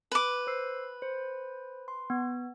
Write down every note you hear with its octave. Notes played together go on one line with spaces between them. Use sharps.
B4 D6
C5 E6 C7
C5
C6
B3